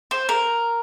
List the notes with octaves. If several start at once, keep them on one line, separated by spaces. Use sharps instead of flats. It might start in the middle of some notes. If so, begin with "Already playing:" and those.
C5
A#4